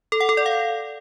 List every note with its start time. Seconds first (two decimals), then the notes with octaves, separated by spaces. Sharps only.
0.12 A4
0.20 F#5
0.29 A4
0.37 D5
0.46 F5